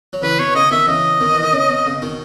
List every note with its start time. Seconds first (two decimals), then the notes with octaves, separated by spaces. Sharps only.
0.13 F#3
0.22 C#3 E3 B4
0.39 B2 C#5
0.55 C#3 D#5
0.71 B2 D#3 E5
0.88 C#3 E3 D#5
1.20 B2 D#3
1.33 E3
1.43 D#3
1.53 C#3
1.69 B2
1.86 C#3
2.02 B2 D#3